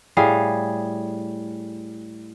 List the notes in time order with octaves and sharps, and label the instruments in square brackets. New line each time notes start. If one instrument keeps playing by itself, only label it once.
[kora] A2 G3 G#4 F5